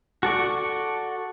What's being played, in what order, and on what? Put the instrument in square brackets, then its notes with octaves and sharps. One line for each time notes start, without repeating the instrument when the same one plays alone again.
[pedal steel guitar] F#4 A4 D5 C#6